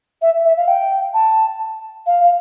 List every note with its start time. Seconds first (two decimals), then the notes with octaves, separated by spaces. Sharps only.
0.22 E5
0.45 E5
0.57 F5
0.68 G5
1.14 A5
2.06 F5
2.24 F5